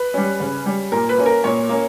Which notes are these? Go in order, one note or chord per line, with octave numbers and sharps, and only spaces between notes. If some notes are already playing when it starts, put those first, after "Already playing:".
Already playing: B4
G3 C#4
C#3
G3 C#4
A#2 A#4
B4
A#3 C#4
A#4
A#2 C#5
A#3 C#4